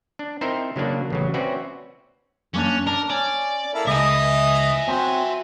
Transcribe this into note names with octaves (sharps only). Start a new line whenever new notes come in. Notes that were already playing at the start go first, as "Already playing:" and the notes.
D4
C4 D#4 E4 A#4 C5 E5
C#3 F#3 A#3 D4
A1 C#3 F#3
C4 C#4 F#4 B4 D5 E5
F#2 A#3 C#4 D4
D4 A#4
C#4 D5
A#3 E4 A4
C#2 D#5 E5 G#5
F#3 C4